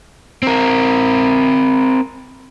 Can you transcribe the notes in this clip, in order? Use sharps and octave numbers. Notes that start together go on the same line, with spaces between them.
C4 A#4